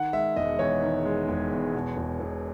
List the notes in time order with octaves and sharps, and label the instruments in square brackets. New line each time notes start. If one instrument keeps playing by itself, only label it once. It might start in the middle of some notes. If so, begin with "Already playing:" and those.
Already playing: [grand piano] D#3 F#5
G#3 E5
E1 D#5
E2 C#5
D#3
G#3
E1
E2
B2
E1
E1